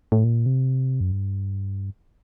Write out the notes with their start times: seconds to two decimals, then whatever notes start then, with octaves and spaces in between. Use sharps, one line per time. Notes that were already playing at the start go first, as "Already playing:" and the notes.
0.12 A2
0.24 A#2
0.46 C3
1.00 F#2
1.12 G2